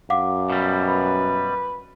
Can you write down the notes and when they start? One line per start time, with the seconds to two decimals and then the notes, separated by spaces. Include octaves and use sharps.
0.10 F#2 F5 F#5 D6
0.50 B2 G3
0.87 B4